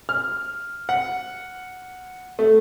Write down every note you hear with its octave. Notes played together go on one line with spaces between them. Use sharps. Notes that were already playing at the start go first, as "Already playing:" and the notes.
F6
F#5
A3